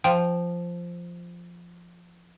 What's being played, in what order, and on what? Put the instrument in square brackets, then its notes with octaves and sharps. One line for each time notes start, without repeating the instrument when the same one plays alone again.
[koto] F3 [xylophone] G5